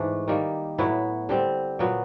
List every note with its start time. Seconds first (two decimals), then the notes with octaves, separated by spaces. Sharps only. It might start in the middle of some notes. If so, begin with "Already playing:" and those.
Already playing: G#2 E3 A3 D4
0.28 D#3 G3 A#3
0.78 A2 F#3 B3 E4
1.29 D3 G3 C4
1.79 A#2 F#3 B3